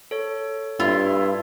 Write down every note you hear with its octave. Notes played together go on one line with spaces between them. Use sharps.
A4 C#5
G2 E4 F4